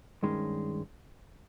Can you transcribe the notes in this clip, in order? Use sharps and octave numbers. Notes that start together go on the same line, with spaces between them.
G2 D#3 G#3 C#4